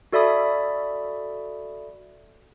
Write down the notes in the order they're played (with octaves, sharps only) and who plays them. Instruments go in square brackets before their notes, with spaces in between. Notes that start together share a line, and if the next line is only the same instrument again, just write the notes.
[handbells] F#4 A4 D5 E5 B5 D#6